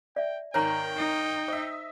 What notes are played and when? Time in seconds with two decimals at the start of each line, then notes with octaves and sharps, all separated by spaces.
0.16 D5 E5 G5
0.54 G#1 D#3 A#4 C#5 G5 G#5 A#5
0.97 D#4
1.48 C5 D#5 E5